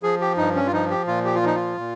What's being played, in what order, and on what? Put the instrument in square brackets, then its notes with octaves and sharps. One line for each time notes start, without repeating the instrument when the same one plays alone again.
[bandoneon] F3 G#4
G4
G2 D#4
C#4
F4
F3 D#4
G4
A#2 F4
G4
F4
F3 D#4
F4
A#2